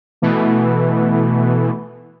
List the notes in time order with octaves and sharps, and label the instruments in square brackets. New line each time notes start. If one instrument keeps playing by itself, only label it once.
[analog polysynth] B2 E3 A3